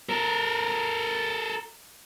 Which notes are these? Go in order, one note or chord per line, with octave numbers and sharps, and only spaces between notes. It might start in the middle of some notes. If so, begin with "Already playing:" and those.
A4 A#4